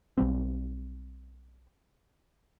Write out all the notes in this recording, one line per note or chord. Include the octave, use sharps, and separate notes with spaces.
B1 B2 G3 C4